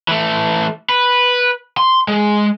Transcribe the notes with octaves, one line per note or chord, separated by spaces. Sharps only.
E3 A3
B4
C6
G#3